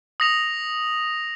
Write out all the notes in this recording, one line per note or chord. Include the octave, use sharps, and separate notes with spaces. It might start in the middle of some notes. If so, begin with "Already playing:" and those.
D#6 A#6 F7